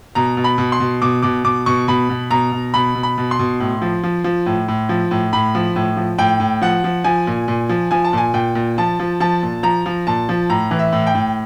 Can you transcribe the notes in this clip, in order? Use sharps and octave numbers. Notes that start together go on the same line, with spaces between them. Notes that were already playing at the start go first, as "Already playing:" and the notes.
B2 A#5
B2
B5
B2
C6
B2
B2 D6
B2 D6
B2 D6
B2 C#6
B2 B5
B2
B2 A#5
B2
B2 B5
B2
B5
B2
C6
B2
A2
F3
F3
F3
A2
A2
F3
A2
A2 B5
F3
A2
F3
A2 G5
A2
F3 F#5
F3
F3 G#5
A#2
A#2
F3
F3 G#5
A5
A#2 G#5
A#2 G5
A#2
F3 A5
F3
F3 A5
A#2
F3 A#5
F3
A#2 A5
F3
A2 A#5
E3
E5
A2
G5
A2